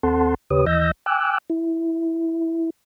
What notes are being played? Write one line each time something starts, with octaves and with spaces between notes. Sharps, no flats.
D#2 C4 A4 F#5 A5 C6
D#2 C#3 G4 B4 C#5 D#6
D#2 E3 D#5 E6 G6 A#6
G5 G#5 D6 E6 F#6
E4